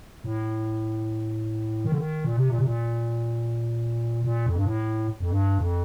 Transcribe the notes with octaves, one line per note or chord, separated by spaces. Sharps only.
A2
D#3
D3
D#3
A#2
C3
A#2
C3
A#2
A#2
F2
G2
A2
F2
G2
F2